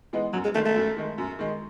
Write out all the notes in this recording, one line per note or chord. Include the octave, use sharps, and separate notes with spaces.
E3 G#3 B3 D#4
F#2 F#3
G#3
D#3 G#3 A3
A3
F#2
D#3 G#3
F#2
D#3 G#3